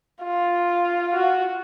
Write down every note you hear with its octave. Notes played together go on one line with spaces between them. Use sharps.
F4
F#4